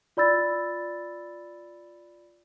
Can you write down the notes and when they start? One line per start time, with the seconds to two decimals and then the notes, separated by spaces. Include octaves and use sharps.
0.17 F4 D5 B5 E6 A6